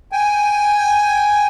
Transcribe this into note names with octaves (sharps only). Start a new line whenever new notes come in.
G5 G#5